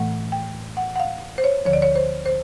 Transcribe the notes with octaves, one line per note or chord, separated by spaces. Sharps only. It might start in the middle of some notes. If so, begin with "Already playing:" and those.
Already playing: A2 E3 A3 F#5
G5
F#5
F#5
F5
C5
C#5
D2 D3 F3 C#5
D5
C#5
C5
C5